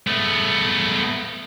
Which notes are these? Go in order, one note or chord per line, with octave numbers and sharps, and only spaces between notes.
A3 B3